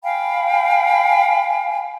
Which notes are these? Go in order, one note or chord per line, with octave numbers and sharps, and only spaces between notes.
F5 G5 G#5 B5